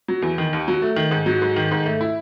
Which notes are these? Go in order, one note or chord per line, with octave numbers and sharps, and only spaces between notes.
F#3
E2
D#3
D#2
F#3
A3
D#3
G#2
F#3
G#2
D#3
G#2
A3
E4